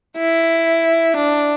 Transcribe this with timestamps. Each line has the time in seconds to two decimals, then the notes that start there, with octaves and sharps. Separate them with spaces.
0.18 E4
1.16 D4